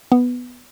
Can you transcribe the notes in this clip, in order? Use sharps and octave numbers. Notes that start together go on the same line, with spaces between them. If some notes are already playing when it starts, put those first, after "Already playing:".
B3